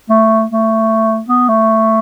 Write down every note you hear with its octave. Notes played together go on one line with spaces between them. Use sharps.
A3
A3
B3
A3